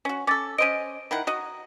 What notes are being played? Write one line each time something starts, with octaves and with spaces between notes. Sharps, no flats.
C#4 F#4
C#4 A4 D6 A6
C#4 C5 D#5 D7 D#7
D#3 E4 F#5
F#4 D#5 A#5